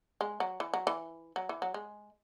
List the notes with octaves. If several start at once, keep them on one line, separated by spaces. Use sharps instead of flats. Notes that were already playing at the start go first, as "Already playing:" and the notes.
G#3
F#3
E3
F#3
E3
F#3
E3
F#3
G#3